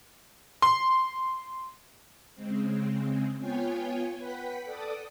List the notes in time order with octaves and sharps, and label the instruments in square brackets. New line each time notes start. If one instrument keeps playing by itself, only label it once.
[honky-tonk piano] C6
[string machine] C#3 G#3 C4
B3 F4 C#5 G5 G#5
B4 F#5 G5 B6
A4 D5 D6 D#6